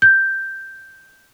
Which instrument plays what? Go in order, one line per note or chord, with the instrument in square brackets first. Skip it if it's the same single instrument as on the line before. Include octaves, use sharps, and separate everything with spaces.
[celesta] G6